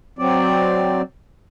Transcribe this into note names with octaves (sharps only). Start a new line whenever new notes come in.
F#3 C4 D5